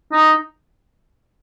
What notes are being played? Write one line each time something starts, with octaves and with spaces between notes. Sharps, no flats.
D#4